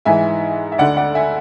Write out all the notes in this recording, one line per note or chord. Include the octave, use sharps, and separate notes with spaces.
G#2 E3 E5 G#5
E5
D2 D3 D5 F#5
D5 F#5
E5 G#5